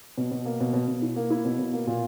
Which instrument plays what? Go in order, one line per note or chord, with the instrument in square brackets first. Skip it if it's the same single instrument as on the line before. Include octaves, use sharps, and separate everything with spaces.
[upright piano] B2
B2
A#3
B2
B2
B2
E4
A#3
E4
B2
B2
A#3
A#2